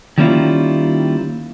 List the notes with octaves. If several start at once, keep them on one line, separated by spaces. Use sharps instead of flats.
D#3 G3 A#3 C#4 E4 F4